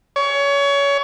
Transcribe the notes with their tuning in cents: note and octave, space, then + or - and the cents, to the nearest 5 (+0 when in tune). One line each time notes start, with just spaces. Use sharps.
C#5 +25